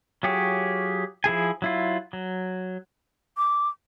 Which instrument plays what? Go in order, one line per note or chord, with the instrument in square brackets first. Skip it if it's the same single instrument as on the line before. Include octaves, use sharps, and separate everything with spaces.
[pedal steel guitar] F#3 F4 G4 G#4 C#5
F3 E4 G#4 G#5
F#3 E4 F4
F#3
[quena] D6